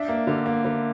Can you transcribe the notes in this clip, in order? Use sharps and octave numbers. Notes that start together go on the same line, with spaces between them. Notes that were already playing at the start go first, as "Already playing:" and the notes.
Already playing: D4 E5
A#3
D3
A#3
D3